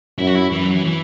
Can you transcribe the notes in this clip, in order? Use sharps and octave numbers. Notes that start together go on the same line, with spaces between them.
F#2 E4
F#4
E4
F#2 E3
F#3
E3
E3